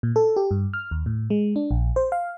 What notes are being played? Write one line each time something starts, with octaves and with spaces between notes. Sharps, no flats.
A#2
A4
G4
G2
F6
D#2
A2
G#3
D4
A#1
C5
F5